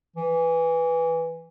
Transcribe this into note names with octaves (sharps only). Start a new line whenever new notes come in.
E3